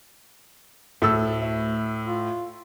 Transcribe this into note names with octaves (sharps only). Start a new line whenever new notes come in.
D2 A2 E4 A4 E6
E4
F4